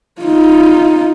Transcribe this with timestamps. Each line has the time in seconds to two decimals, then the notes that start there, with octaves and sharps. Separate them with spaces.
0.22 D#4 F4